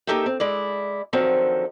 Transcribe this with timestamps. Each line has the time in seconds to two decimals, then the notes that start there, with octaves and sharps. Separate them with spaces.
0.07 A#3 D#4 G4 A4 E5 G5
0.26 C4
0.40 G#3 E4 D5
1.13 D3 D#3 F3 F#3 C4 A4